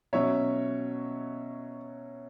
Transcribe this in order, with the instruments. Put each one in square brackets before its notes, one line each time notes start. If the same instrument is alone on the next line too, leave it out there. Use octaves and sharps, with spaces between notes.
[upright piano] B2 F#3 C#4 C#5 E5